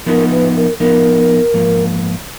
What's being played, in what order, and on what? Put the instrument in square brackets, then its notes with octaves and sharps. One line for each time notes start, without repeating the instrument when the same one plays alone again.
[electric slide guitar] F3 B3 D#4 [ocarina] A#4
[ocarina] B4
A#4
[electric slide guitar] F3 B3 D#4 [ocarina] A#4
[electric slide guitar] G#2 F3 A#3